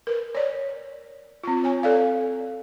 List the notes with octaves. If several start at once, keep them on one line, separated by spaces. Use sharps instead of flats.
A#4 B4
C#5 D5
C4 F4
C#5 G#5
A4 D5 F5